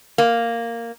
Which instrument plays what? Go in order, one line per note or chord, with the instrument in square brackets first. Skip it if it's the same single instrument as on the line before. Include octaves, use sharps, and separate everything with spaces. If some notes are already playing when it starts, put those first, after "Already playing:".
[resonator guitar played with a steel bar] A#3